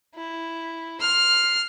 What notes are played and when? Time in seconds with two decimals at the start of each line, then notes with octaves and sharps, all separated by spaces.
0.15 E4
1.00 C6 F6